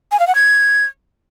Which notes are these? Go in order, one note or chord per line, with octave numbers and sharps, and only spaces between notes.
G#5
F5
F#5
G#6